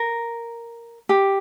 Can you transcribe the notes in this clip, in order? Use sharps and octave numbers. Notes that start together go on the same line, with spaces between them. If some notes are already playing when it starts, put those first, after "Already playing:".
Already playing: A#4
G4